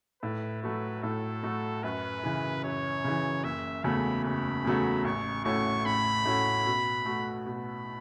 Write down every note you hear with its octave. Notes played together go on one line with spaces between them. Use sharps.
A2 B4
F#3 A3 F#4 B4
A2 A4
F#3 A3 F#4
F#2 B4
C#3 E3
F#2 C#5
C#3 E3
F#1 E5
E2 C#3 F#3 A3 B5
F#1 B5
E2 C#3 F#3 A3
A1 C#6
A2 A3 C#4 F#4 C#6
A1 B5
A2 A3 C#4 F#4
B2
A3 F#4
B2 B5